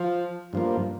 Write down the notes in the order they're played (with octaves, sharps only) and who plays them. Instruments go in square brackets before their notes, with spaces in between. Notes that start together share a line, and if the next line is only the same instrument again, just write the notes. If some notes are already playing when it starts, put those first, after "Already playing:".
Already playing: [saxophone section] F3
[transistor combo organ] G2 F3 A#3